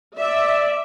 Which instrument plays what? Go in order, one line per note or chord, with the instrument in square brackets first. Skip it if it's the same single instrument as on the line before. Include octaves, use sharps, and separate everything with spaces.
[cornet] D5 [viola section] E5